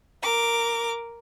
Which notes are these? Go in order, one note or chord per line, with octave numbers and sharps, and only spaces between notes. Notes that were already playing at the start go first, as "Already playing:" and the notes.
A#4 D6